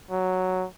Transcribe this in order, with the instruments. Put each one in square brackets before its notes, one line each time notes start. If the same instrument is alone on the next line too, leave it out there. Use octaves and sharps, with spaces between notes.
[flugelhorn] F#3